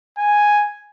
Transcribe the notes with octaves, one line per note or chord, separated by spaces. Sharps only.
G#5